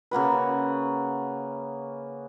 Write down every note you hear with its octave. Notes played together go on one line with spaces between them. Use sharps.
C#3 A#3 F#4 B4